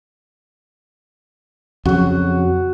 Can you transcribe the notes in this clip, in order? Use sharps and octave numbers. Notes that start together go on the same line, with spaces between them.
F2 C#3 F#3 F#4